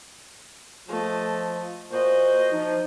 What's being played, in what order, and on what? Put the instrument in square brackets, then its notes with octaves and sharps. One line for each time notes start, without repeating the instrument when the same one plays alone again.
[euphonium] F3 [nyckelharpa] A3 D#5
[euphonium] A#2 [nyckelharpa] F#4 D#5 [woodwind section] C5
[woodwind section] F3 [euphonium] D#4